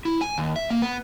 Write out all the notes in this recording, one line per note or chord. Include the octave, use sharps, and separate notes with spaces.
E4
G#5
D#2
E5
A#3
B3